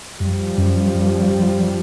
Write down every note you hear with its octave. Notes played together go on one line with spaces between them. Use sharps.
F#2 F3 G3
F#2
F#2